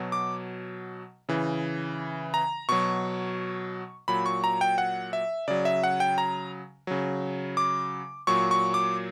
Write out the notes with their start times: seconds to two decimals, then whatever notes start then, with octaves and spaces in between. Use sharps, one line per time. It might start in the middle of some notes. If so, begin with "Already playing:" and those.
Already playing: B2 F#3
0.12 D6
1.29 C#3 E3
2.34 A#5
2.69 B2 F#3 C#6
4.08 A#2 F#3 B5
4.26 C#6
4.44 A#5
4.61 G5
4.78 F#5
5.13 E5
5.48 C#3 F#3 D5
5.65 E5
5.83 F#5
6.00 G5
6.18 A#5
6.87 C#3 F#3
7.57 D6
8.27 A#2 F#3 C#6
8.51 C#6
8.74 D6